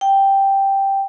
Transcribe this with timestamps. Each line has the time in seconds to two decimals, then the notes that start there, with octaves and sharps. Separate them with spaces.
0.01 G5